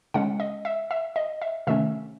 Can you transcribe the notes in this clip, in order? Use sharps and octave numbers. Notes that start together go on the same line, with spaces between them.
C#3 G#3 C#4 F#5
D#5
E5
E5
D#5
E5
C3 D#3 A3 C#4 E5